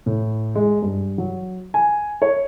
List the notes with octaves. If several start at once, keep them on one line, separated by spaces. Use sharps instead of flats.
A2
G#3
G2
F#3
G#5
C#5